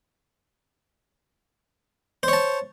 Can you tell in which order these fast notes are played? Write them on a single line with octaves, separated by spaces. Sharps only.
C5 C#5 A5